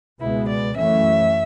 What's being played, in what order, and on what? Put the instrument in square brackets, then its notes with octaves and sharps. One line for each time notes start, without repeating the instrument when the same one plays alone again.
[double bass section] C#2 B2 G#3 B3 [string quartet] E4
[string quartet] D5
[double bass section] F#2 E3 A3 C#4 [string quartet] E5